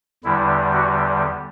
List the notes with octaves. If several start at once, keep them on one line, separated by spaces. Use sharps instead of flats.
E2 D3 G3 E4
F#4